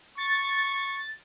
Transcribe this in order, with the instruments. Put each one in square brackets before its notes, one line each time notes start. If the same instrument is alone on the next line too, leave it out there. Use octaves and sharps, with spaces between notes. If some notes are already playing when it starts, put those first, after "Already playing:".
[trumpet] C#6 [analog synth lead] A6